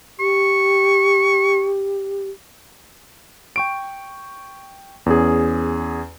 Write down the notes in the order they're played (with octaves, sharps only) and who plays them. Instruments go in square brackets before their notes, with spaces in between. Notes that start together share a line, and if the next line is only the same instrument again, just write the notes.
[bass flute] G4 [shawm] C#6
[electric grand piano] G5 C#6 D7
E2 C#4 G#4